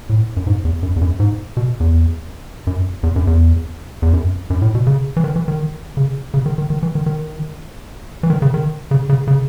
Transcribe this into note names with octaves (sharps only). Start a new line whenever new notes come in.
A2
F#2
G#2
E2
F#2
E2
F#2
G#2
B2
E2
F#2
E2
F#2
E2
E2
F#2
F#2
A2
B2
C#3
E3
D#3
E3
D#3
C#3
C#3
D#3
D#3
D#3
E3
D#3
D#3
E3
D#3
C#3
D#3
C#3
C#3
C#3